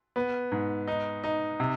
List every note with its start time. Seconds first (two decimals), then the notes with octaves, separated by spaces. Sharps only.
0.16 B3
0.52 G#2
0.87 D#4
1.24 D#4
1.60 C3